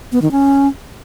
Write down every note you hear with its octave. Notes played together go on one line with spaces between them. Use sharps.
B3
D#3
C#4